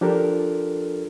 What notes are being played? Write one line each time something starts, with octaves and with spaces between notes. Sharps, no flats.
F3 D4 F4 G4 A4 A#4